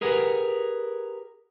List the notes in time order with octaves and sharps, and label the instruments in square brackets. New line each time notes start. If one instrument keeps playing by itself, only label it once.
[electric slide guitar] G4 G#4 A#4 B4 F#5